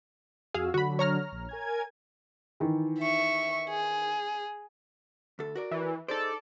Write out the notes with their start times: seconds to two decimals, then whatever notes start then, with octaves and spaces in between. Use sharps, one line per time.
0.54 F2 F#4 G#4 F5 E6
0.74 D3 F#3 F#4 B5
0.99 C#5 A#5 F6
1.32 A#1
1.49 A#4 G#5 G#6
2.60 D#3 E3
2.99 E5 C#6
3.69 G#4
5.39 D2 A4
5.55 F#4 A#4 D5
5.71 E3
6.08 D#4 G#4 A4 C5 D5